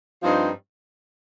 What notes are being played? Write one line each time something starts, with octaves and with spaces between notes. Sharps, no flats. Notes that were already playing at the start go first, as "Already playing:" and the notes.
G2 F3 C4 D#4